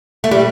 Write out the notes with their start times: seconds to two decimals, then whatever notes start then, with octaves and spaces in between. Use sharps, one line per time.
0.24 A3
0.31 G3